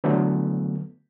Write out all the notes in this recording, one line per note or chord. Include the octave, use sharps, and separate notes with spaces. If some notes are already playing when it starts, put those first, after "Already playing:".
D3 E3 F#3 A3 B3